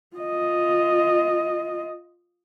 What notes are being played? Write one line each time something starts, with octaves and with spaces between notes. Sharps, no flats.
F4 D#5